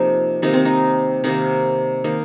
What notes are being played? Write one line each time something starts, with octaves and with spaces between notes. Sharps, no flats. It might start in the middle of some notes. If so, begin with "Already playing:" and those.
Already playing: C3 F3 A#3 D#4
C3 D#3 A#3 D#4
C4
D#4
C3 D#3 A#3 D#4
D#3 A#3 D#4